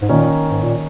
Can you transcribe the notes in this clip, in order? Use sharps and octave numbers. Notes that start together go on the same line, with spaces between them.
G#2
A#2 D#3 A#3 C#4
G#2
A#2